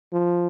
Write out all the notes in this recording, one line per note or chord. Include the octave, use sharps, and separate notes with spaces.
F3